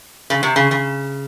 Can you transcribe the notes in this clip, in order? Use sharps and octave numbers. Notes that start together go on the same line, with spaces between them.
C#3
C3
C#3
C#3